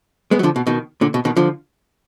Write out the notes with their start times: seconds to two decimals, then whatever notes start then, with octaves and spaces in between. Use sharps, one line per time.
0.31 G#3 B3
0.39 F#3
0.43 D3 F3
0.56 B2
0.67 B2 D#3
1.01 A#2 D3
1.14 B2
1.25 B2 D#3
1.37 D3 F3